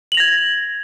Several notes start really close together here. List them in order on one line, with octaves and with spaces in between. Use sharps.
F#7 F7 A#6 G#6